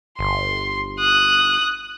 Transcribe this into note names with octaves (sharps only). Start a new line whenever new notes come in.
G1 C6
D#6 F#6